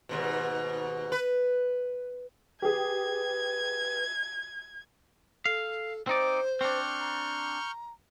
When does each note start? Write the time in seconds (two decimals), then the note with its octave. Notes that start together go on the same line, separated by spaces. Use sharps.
0.09 D#2 G#2 B2
1.12 B4
2.62 G4 G#4 B4 G#6
5.46 A4 F5
6.07 C4 D#4 C5 D5
6.61 C4 D4 C#6 F6 G6
7.00 A#5